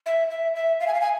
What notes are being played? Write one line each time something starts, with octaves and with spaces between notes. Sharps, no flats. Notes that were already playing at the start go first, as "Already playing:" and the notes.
E5
E5
E5
F5
G#5
F5
G#5